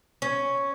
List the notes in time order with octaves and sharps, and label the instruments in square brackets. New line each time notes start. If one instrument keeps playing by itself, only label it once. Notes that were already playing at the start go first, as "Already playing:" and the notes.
[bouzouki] C#4